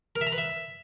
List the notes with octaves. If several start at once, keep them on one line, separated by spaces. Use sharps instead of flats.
A#4
E5
A#5
B4
E5